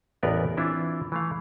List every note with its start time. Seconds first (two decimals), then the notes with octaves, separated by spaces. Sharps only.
0.23 A1 E2 B3 A#4 B4 D5
0.57 E3 C4 D4 E4 F4
1.12 E3 A3 F5